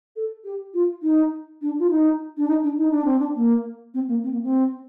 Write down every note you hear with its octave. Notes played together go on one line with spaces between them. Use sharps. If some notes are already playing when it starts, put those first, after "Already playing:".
A4
G4
F4
D#4
D4
F4
D#4
D4
D#4
D4
D#4
D4
C4
D4
A#3
C4
A#3
C4
A#3
C4